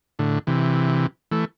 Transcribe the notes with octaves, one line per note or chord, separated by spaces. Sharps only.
A2 D3
C3 E3
E3 A3